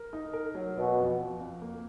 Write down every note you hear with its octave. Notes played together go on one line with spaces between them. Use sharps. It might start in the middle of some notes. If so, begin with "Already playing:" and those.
Already playing: A#4
D#4
A#4
F#3
B2 B3
F2
F2
F2
A#3